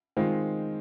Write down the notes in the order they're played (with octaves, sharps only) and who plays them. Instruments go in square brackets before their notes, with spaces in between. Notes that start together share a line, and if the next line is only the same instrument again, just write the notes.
[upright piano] D#3 G#3 C4 F4